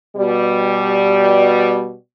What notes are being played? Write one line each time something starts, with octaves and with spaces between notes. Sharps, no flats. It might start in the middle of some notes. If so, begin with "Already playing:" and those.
B2 G3